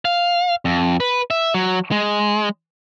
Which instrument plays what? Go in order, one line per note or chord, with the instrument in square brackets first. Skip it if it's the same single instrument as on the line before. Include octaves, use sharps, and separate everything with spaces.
[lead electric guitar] F5
F2
B4
E5
F#3
G#3